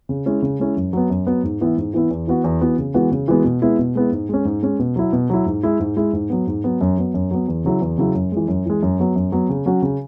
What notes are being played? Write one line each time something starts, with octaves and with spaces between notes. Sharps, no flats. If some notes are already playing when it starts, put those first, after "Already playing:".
C#3
G#3 C#4 E4
C#3
G#3 C#4 E4
F#2
F#3 B3
F#2
F#3 B3
G#2
E3 B3 E4
G#2
E3 B3 E4
E2
E3 B3 F#4
E2
E3 B3 F#4
C#3
E3 G#3 B3 F#4
C#3
E3 G#3 B3 F#4
B2
G#3 B3 E4
B2
G#3 B3 E4
G#2
G#3 C#4
G#2
G#3 C#4
B2
F#3 E4
B2
F#3 E4
G#2
G#3 E4
G#2
G#3 E4
G#2
F#3 B3
G#2
F#3 B3
F#2
F#3 B3
F#2
F#3 B3
E2
C#3 F#3 E4
E2
C#3 F#3 E4
F#2
E3 G#3
F#2
E3 G#3
F#2
F#3 B3
F#2
F#3 B3
C#3
F#3 C#4 F#4
C#3